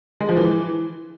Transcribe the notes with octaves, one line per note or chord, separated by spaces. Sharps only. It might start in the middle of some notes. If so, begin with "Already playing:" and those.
G#3
F3
E3